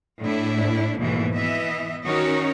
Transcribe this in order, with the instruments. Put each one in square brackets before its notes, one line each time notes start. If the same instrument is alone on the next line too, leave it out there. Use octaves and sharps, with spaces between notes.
[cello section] A2 A3 D4 E4
D#2 G#2 B2 E3 A3
E3 B3 D#5 E5
D#3 C#4 D#4 F#4 A#4 C#5